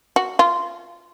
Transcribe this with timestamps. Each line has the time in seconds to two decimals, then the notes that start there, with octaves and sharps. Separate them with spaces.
0.16 F#4
0.39 F4